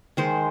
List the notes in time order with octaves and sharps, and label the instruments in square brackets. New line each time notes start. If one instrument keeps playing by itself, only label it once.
[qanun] D#3 G#3 C5